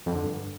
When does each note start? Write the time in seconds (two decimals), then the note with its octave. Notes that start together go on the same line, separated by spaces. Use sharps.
0.06 F2
0.15 D3
0.23 G2